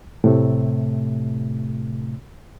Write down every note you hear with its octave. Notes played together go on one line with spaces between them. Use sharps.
A2 C3 A3